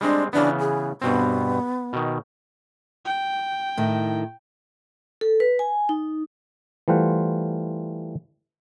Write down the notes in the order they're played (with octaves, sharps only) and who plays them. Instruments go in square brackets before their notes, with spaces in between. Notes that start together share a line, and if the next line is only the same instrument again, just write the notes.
[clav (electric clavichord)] G3 G#3 C4 [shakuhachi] D4
[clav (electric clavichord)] C#3 E3 B3 [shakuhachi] D4
[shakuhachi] G#4
[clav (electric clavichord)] G2 B2 C4 [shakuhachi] B3
[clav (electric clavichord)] B2 D#3
[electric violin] G5
[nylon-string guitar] A2 D#3
[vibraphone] A4
B4
G#5
D#4
[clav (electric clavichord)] E3 G3 A3 F4 C5 F#5